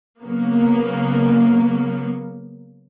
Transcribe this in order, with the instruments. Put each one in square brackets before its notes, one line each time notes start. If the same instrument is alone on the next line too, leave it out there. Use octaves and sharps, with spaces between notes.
[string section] C#3 F#3 A#3 B3